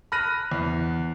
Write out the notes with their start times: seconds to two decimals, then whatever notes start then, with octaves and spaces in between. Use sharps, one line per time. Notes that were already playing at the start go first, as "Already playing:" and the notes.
0.12 B5 F6 F#6 A#6 D#7
0.51 E2